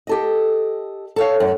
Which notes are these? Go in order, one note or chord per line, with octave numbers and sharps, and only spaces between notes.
G4 A4 D#5
A4 C#5 F5
F#2